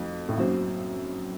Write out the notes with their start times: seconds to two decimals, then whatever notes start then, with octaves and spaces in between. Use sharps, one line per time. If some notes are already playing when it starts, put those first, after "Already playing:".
Already playing: F2 A3 D#4 F#4
0.29 A2
0.38 F#2 A#3 D#4 F#4 C5